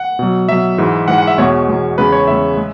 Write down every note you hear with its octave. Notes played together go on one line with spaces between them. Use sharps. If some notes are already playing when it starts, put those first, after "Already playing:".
Already playing: F#5
B2 F#3
B2 F#3 E5
G#2 E3 G#3
G#2 E3 G#3 F#5
F#5
E5
E2 B2 G#3 C#5
E2 B2 G#3
E2 C#3 G#3 B4
C#5
E2 C#3 G#3 E5
G#3